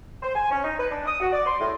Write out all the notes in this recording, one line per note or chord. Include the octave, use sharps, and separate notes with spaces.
C5
G#5
C#4
D#4
B4
D4
D#6
F#4
D5
C6
A2